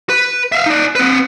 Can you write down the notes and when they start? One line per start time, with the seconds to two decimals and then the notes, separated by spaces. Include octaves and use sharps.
0.09 B4
0.52 E5 F5
0.66 D#4 D5
0.95 C4 B4